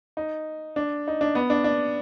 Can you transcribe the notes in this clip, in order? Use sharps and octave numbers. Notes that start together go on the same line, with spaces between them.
D#4
D4
D#4
D4
B3
D4
D4